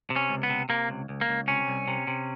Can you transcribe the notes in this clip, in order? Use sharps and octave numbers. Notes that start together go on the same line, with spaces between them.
C3
C#4
C#2
B3
C3
C3 A#3
C#2
C#2
A#3
C#2
C3 C#4
C2
C3
C3